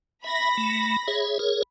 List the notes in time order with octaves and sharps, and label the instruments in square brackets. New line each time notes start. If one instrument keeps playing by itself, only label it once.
[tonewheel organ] E5 [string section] B5 A#6
[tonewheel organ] A3
G#4 C#5 E5
G#4 A#4 C#5